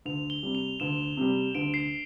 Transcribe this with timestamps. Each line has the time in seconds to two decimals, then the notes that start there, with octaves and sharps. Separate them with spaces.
0.06 D2 F7
0.30 G7
0.43 C3 G3
0.55 F7
0.80 D2 E7
1.17 C3 G3
1.55 D2 D7
1.74 C7